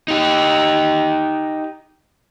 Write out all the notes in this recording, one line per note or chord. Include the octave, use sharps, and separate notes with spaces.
D#4 G4